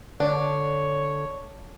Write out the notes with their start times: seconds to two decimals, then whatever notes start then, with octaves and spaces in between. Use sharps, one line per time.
0.20 D3 D4 C#5